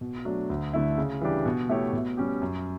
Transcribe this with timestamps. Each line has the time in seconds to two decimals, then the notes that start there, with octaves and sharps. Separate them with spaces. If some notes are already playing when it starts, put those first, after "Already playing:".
0.01 B2
0.25 F#3 A3 D4
0.50 D2
0.73 D3 A3 E4
0.98 C#3
1.21 E3 G3 D4 G4
1.46 B2
1.69 A3 E4 G4 C#5
1.93 B2
2.17 G3 C#4 G4
2.42 F#2